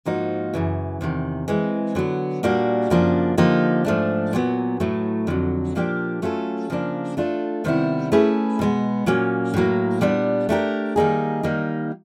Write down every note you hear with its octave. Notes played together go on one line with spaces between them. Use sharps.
G#2 F3 A#3 D#4 F#4
F#2 C#3 E3
E2 C3 D#3
E3 G#3 C4
D3 F#3 B3
A#2 G3 A#3 D4 F#4
F#2 C#3 F3 A#3 D4
D3 F3 A#3 D#4 G4
G#2 F3 A3 D4
A#2 F#3 B3
A2 F#3 A3
F2 D3 F#3
A#2 F3 A#3 D4 G4
F#3 A3 C#4 F4 A4
C#3 F3 A#3 D4
A3 D4 F4 A4
C3 D#3 G3 B3 E4
A3 C#4 E4 G#4 B4
B2 G#3 B3
A#2 F#3 A#3 C#4
A2 F#3 A#3
A#2 G3 B3 D4
A3 D4 G4 A#4
D#3 G3 A#3 D#4 G#4
D#3 G3 A#3 D#4